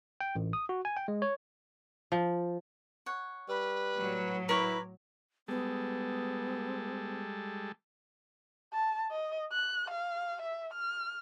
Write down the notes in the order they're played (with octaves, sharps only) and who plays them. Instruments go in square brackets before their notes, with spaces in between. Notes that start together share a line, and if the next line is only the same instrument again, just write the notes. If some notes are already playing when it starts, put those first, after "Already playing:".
[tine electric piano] G5
A1
D#6
F#4
G#5
G5
G#3
C#5
[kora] F3
[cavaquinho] C#5 F#5
[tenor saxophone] G3 [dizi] B4
[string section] A2 F#3
[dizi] E4 [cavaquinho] A#4 C#5 D6 [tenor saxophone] B4
[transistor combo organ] G3 G#3 A4 [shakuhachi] B3
[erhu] A5
D#5
F#6
F5
E5
F6